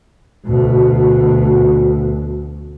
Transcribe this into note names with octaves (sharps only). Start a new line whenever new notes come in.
D2 B2